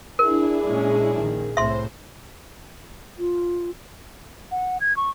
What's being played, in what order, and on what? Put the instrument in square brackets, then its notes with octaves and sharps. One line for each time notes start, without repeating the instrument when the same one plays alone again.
[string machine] D4 E4 [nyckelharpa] G#4 [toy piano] A#4
[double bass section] A#2 G#3 C#4
A#1 D#3
[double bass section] C2 A2 C3 [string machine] C5 [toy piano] E5 C6
[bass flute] F4
[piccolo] F#5
G#6
C#6